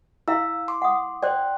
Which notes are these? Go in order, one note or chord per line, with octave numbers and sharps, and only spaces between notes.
E4 F5 E6
C6 D6
F#5 D#6
C5 D5 G5 C6 F#6